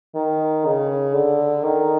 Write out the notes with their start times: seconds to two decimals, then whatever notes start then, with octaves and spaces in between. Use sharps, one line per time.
0.15 D#3
0.65 C#3
1.14 D3
1.64 D#3